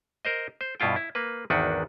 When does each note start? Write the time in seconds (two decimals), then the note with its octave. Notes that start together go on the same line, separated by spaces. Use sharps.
0.25 A#4 C5 D#5
0.61 C5
0.80 G2 B2 E4 F4 G5
0.96 E4
1.15 A#3 B4
1.50 G#1 E2 D#3 D4 F#4 B4